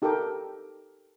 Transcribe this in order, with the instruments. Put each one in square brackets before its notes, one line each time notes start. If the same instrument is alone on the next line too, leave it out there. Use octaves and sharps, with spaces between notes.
[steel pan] D#4 G4 A4 A#4 G5 D6